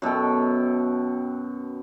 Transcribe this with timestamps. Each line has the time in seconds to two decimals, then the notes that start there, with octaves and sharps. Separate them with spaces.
0.02 F#2 B2 A4 G5